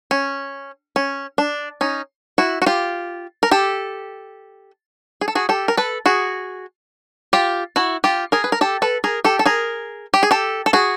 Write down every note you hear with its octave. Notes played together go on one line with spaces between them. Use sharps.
C#4
C#4
D4
C#4 D#4
E4 F#4
F#4
F4 G4
A#4
G4 A4
G#4
A4
F#4 G#4
G4 A4
A#4
A4 B4
F#4 G#4
F4 G4
E4 F#4
F4 G4
G#4 A#4
B4
A#4
G4 A4
A4 B4
G#4 A#4
G4 A4
A4
G#4 A#4
G4
G#4
G4 A4
A4
F#4 G#4